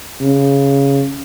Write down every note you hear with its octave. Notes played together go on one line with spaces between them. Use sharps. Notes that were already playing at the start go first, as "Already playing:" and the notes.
C#3